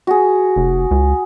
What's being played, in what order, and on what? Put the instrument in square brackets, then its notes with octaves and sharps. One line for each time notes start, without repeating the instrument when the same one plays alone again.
[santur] F#4 G#4
[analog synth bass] F1
C#2